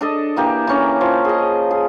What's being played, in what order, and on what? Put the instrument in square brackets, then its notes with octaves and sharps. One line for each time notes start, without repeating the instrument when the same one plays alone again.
[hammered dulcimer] D4 A4 D#5
E3 A#3 G4
E3 C#4 A#5
F3
G#4 D#5
G#4